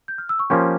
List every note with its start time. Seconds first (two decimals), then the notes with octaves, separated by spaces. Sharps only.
0.08 G6
0.18 F6
0.29 E6
0.39 C#6
0.50 F3 A#3 C#4 G4 C6